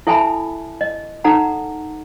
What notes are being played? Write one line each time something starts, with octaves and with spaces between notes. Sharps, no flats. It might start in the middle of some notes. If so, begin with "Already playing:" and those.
E4 A4 E5 G#5 A5 B5
D#5
D#4 A4 F#5 A#5